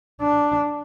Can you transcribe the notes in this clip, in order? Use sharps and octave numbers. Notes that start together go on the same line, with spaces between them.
D4